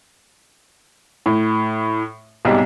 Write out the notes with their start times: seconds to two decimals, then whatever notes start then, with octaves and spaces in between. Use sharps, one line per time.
1.26 A2
2.45 B1 G#2 C3 G3 G#3